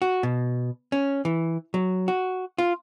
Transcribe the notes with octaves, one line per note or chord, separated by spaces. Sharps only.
F#4
B2
C#4
E3
F#3
F#4
F4